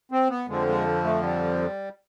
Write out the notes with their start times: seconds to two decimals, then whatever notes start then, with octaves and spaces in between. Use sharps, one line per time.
0.12 C4
0.30 B3
0.48 F2 D3 F3 G#3
0.67 G#3
1.04 A3
1.22 G3